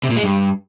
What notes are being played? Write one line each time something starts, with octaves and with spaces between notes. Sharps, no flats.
C3
A#2
G#3
G2